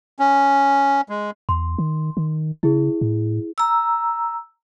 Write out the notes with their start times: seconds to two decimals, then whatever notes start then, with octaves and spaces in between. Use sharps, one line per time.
0.19 C#4
1.09 G#3
1.49 E2 C6
1.78 D#3
2.17 D#3
2.63 C#3 E4 G#4
3.01 A2
3.58 A#5 E6